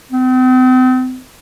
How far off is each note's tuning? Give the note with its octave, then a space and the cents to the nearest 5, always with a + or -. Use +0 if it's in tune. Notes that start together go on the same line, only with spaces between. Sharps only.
C4 -40